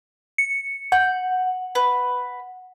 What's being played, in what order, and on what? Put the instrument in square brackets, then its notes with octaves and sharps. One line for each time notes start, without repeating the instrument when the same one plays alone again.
[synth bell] C#7
[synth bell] F#5 [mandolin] G6
[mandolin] B4